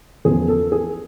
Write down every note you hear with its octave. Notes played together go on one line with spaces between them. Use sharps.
E2 C#3 F3 G#4
A4
G#4